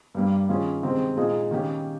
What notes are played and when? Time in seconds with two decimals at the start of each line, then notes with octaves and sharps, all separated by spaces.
0.15 G2 G3 A#3
0.49 D#3 A#3 C#4 F4 G#4
0.83 C3 D#3 G#3 C4 G4
1.17 A#2 G#3 D#4 G#4
1.51 D#3 A#3 C#4 G4